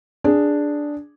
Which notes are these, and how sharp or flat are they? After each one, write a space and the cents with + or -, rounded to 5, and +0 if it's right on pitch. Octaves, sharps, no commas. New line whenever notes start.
D4 +0 G#4 -5